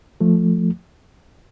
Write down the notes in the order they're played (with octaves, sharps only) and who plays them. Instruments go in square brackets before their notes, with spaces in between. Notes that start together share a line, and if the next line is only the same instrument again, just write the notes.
[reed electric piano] F3 A3